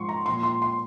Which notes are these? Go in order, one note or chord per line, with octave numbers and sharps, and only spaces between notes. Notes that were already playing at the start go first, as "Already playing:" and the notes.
Already playing: G#2 F3 C6 C#6
A#5
A#2 F3 C6
C6
C6